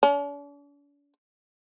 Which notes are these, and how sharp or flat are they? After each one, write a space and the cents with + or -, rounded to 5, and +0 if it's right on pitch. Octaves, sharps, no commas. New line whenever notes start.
D4 -45